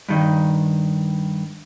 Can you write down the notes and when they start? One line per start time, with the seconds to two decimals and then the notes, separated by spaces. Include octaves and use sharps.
0.09 G2 D#3